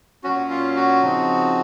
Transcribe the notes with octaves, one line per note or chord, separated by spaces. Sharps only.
A#2 F#3 C#4 F#4
F4
F#4
C#3 F3 C4 D#4